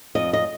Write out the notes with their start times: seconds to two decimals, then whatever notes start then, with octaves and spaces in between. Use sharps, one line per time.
0.15 F2 D#5
0.33 D#5